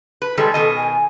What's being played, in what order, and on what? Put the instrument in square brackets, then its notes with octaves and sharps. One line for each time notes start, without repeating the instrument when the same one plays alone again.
[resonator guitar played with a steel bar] B4
[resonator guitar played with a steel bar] D#3 G3 G#3 [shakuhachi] A4
[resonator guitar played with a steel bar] B2 D#3 D#5
[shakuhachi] G#5